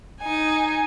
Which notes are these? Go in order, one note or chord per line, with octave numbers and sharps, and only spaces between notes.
D#4 G#5